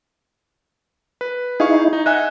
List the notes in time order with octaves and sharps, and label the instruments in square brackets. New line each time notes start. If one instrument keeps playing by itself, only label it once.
[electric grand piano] B4
[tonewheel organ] D#4 E4 [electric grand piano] G#4 F5 C#6
[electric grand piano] D#4
[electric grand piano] D#5 E5 G#5 [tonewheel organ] F#5